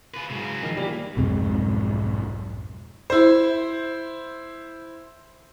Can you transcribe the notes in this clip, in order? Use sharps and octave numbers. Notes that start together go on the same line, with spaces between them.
F4 B4
G#2 C#3 F#3
D#3 F3
E3 G3 A#3
B1 F2 G#2 G#3
E4 C5